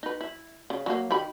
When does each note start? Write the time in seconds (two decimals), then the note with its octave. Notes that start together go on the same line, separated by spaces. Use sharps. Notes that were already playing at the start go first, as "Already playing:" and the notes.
0.03 D#4 B4
0.21 E4
0.70 C#3
0.86 F#3 G#3 A#3
1.11 D#3 G4 B5